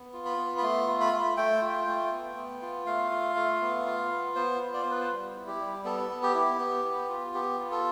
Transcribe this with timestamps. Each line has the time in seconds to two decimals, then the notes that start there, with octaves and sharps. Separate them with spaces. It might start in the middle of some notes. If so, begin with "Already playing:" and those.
Already playing: B3
0.13 F4
0.25 B5
0.37 B3
0.58 B5
0.63 A3 C6
0.87 F4
1.01 B5
1.13 A3
1.37 A3 G5
1.62 F4
1.87 A3
2.12 B3
2.36 B3
2.62 F4
2.86 A3 F5
3.11 F4
3.36 A3
3.61 B3
3.86 F4
4.12 B3
4.35 B3 C5
4.61 F4
4.73 D5
4.82 B3 C5
4.91 B4
5.00 C5
5.11 G3
5.36 E4
5.47 G4
5.60 G3
5.84 B3 A4
6.10 B3
6.23 G4
6.35 E4
6.59 B3
6.84 B3
7.09 F4
7.34 B3 G4
7.59 F4
7.72 A4